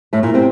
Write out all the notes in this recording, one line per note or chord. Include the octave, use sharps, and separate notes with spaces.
A2 A3
A#2 A#3
C3 C4